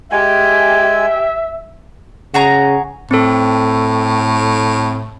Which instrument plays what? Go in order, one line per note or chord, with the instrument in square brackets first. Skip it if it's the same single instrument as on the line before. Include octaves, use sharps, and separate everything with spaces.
[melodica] G#3 G#5 [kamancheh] G4 G5 [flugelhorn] E5
[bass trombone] C#3 [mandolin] F#4 G#4 A#5
[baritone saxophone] A2 [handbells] C4 A4